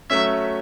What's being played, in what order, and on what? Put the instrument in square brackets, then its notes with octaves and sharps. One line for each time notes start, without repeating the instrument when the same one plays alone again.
[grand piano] F#3 A3 C#4 [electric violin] E5